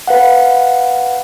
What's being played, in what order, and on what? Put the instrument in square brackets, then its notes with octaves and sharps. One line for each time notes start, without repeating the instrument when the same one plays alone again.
[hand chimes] B4 F5 F#5